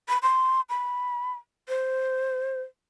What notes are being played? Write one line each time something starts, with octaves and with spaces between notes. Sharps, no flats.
B5
C6
B5
C5